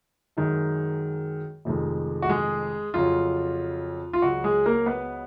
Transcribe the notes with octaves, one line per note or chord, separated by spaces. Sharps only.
F#2 D#3 G#3
F1 F2 D#3 G#3
F#4
G#3 G#4
F2 C#3 F#3 F4
F4
C#2 C#3 F#3 F#4
G#3 G#4
A#3 A#4
B3 B4